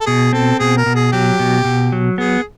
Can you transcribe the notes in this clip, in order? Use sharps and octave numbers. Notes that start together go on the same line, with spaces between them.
A4
B2 G#4
C4 A4
B2 G#4
A#4
B2
G#4
F#3 G4
B2
B2
F#3
B3 G#4